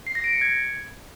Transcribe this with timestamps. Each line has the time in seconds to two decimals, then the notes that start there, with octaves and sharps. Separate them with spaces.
0.07 C7
0.15 A#6
0.24 D7
0.33 C#7
0.41 G#6